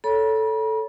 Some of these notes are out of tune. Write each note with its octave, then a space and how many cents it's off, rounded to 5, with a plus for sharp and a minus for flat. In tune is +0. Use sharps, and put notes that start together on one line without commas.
A4 +0 C#5 +25 B5 -45